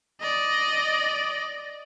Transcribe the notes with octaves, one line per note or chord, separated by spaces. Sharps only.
D5 D#5